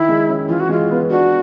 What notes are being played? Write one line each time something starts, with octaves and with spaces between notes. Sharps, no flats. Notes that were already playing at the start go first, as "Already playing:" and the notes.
Already playing: D#3 E4
G#3
C#4
E3 F4
F#4
G#3 F4
B3
D4 F#4